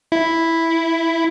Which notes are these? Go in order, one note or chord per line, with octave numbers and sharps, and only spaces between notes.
E4